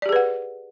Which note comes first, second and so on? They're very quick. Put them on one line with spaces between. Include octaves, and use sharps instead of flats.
D5 G4 G#4 B4 F#5